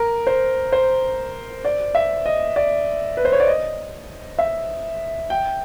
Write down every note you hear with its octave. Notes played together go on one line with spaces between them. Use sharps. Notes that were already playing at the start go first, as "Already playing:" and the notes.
Already playing: A#4
C5
C5
D5
E5
D#5
D5
B4
C5
C#5
D5
D#5
E5
G5